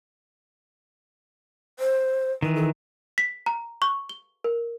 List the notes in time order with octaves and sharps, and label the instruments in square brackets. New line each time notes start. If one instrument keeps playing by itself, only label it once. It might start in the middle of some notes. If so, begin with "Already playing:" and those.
[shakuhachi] C5
[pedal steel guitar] D#3 E3 [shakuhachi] B4
[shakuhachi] A4
[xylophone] B6
A#5
C#6
G7
A#4